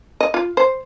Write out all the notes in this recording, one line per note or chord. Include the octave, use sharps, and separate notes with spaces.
D#5
F4
C5